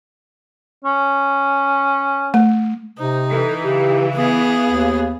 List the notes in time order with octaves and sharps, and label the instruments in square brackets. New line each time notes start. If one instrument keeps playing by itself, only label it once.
[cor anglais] C#4
[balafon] A3
[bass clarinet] C3 [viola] D#4 [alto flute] C5
[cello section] E3 [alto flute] A4
[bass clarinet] C#3 [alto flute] G4
[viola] B3 G#4 [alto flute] F5
[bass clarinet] D#2